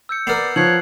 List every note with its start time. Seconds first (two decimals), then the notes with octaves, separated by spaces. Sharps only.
0.09 E6 G6 C#7
0.27 B3 A#4 D5 F6 C7
0.56 F3 C#5 F#6 C7 F#7